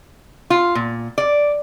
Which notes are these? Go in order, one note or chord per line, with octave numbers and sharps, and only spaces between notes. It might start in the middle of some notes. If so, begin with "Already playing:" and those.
F4
A#2
D5